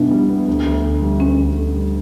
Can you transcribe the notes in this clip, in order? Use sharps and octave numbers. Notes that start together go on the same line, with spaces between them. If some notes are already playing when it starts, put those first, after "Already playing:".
Already playing: B2 G3 B3 D4 E4
G3
B3
D2
D2
D3
G3
D2 C#4
D2
D3
G3